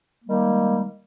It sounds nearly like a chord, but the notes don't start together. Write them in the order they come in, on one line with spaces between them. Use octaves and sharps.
A#3 G3 D#3 G#3